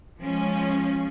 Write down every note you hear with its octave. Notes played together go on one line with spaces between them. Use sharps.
F3 G#3 C#4